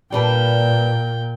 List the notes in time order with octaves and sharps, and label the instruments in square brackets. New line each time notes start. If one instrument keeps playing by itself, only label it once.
[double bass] A#2 [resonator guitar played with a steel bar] G3 D4 B4 [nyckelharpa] A#4 G5